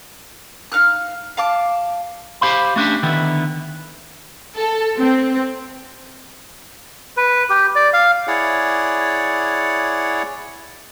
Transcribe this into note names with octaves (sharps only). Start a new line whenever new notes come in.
D#4 F5 F6 F#6
F5 A5 D6
G4 C5 F5 B5
A3 C#4 D4 G4
D3 D#3 B3 E4
A4
C4
B4
G4
D5
F5
E4 G#4 C#5 D5 F#5